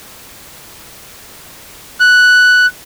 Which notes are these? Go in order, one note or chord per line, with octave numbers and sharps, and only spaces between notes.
F#6